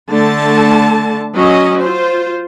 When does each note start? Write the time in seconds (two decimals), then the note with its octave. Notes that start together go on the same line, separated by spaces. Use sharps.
0.10 D3 A3 A5
1.33 F#3 C#4 D#5
1.81 F4 C5